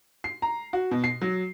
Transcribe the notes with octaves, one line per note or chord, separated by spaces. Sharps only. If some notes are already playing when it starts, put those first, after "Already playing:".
C7
A#5
F#4
B2
C7
F#3